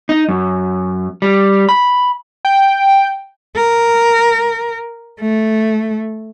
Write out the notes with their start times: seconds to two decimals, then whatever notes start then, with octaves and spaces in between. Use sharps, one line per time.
0.09 D#4
0.29 F#2
1.22 G3
1.69 B5
2.45 G5
3.56 A#4
5.20 A3